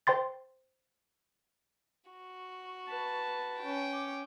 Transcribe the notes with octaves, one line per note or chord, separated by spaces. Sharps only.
C5 G5 C6 A6
F#4
B4 A5
C#4 G5
D6